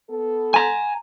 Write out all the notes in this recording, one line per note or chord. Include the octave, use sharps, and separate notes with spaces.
B3 A4
G#5 A#5